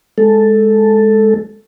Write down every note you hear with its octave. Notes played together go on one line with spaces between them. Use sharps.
G#3 A4